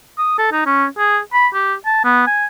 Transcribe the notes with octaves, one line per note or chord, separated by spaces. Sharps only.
D#6
A4
D#4
C#4
G#4
B5
G4
A5
B3
G#5